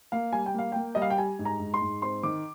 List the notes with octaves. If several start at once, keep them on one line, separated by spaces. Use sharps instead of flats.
A#3 F5
G3 G#5
G5
A#3 F5
A#3 G5
G3 D#5
F5
G5
G4 G#5
G#2
A#5
G#2
C6
G#2
C4 C6
D#3 D6